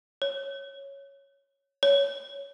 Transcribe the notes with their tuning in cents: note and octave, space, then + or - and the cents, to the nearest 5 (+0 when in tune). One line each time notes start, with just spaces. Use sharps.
C#5 -5
C#5 +10